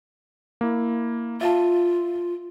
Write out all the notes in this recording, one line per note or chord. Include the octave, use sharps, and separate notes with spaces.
A#3 E4
F4 E5 F5 A5